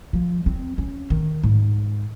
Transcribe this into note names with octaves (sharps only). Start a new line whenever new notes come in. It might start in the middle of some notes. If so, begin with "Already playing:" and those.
F3
C4
C#4
D#3
G#2